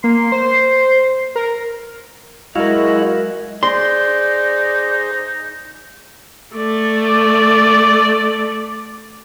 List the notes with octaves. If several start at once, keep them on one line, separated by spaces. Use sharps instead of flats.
A#3 C6
C5
A#4
F#3 G#3 E4 F#4 A#4 D#5 F5
D#4 G#4 C5 D5 C6
A3 D5